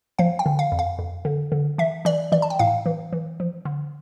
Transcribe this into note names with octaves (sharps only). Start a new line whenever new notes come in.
F3 F5
G5
D3
F5
F2
F5
F2
D3
D3
E3 E5
E3 D5
E3 D5
A5
G5
A2 F5
E3
E3
F3
D3